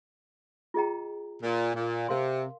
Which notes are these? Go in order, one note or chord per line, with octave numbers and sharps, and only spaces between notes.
F4 G#4 D#5 G5 A#5
A#2
A#2
C3 A#4 F5 C6